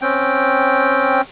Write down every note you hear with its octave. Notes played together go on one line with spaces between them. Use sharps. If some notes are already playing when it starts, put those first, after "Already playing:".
C4 C#4 G5